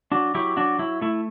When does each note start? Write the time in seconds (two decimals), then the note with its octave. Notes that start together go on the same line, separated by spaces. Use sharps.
0.12 F#3 D4 F#4
0.35 F#3 E4 G4
0.57 F#3 D4 F#4
0.79 F#3 E4
1.01 A3 E4